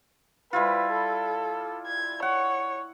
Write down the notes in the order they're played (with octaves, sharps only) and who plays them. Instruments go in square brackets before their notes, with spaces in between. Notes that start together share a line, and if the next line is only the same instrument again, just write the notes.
[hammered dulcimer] G3 E4 F4 [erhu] B4
[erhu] A4
G#6
[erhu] C#5 [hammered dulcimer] F#5